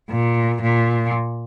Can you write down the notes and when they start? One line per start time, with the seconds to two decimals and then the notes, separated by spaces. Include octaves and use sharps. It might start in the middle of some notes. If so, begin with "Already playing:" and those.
0.10 A#2
0.62 A#2